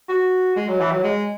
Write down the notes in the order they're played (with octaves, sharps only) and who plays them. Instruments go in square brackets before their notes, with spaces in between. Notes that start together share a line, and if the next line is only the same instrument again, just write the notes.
[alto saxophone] F#4
G#3
F#3
E3
F#3
G#3